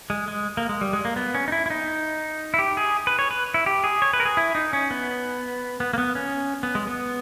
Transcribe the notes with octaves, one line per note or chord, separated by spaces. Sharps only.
G#3
G#3
A#3
G#3
G3
G#3
A#3
B3
C#4
D#4
E4
E4
D#4
E4
G4
G#4
B4
C#5
B4
E4
G4
G#4
C#5
B4
A#4
G#4
E4
D#4
C#4
B3
B3
A#3
B3
C#4
B3
G#3
B3